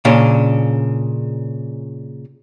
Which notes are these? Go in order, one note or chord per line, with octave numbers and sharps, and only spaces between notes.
A#2 C#3 C#4 D4